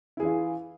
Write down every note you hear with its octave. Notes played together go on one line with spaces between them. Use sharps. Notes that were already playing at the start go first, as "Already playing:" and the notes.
E3 E4 F4 G#4